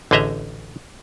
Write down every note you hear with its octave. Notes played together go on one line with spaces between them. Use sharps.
A1 D3 G#4 D#5 E5 A#5